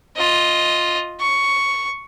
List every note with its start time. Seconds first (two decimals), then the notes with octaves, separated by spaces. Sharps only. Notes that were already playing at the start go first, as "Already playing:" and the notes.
0.16 F4 D#5
1.20 C#6